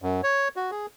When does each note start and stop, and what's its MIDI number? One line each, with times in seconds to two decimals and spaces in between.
0.02 0.21 42
0.23 0.48 73
0.56 0.71 66
0.71 0.86 68